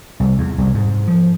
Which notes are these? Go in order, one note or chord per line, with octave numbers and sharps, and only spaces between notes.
C2
E2
C2
G#2
F3